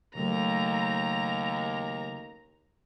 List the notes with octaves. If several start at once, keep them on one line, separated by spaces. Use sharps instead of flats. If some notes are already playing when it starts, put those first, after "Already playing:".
D#2 C#3 F#3 A3 A#5